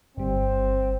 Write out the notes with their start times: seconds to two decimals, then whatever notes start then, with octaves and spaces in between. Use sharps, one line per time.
0.17 G1 G3 C4